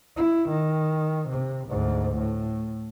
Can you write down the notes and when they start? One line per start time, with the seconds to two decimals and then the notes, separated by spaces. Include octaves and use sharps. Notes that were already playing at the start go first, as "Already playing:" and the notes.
0.17 E4
0.50 D#3
1.29 C3
1.68 D2 G#2
2.17 A2